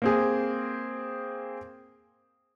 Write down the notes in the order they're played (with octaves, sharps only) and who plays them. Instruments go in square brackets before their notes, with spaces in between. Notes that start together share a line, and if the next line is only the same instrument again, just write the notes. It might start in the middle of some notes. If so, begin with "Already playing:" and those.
[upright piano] A#3 C4 G#4